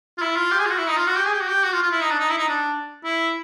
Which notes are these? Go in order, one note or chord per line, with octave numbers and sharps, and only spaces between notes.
F4
E4
F4
G4
G#4
F4
F#4
E4
D#4
F4
F#4
G4
G#4
G4
F#4
G4
F#4
F4
F4
E4
D#4
D4
D#4
E4
D#4
D4
E4